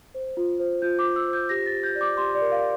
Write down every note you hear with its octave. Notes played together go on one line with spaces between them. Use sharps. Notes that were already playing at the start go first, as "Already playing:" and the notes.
C5
F4
C5
F4 G6
D6
F4
E6
C5
G6
G4 A#6
A6
G4
G6
D5
D6
G4 C6
D5
A#4
F5